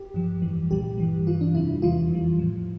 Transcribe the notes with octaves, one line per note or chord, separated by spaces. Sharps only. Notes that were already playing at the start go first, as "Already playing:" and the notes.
Already playing: G4
G2 F3
F2 E3 G3
C2 A#2 G3 G4
G2 E3 G3
G2 E3 G3 F4
D4
F2 C3 G3 E4
E2 E3 G3 F4
F2 E3 G3
A2 F3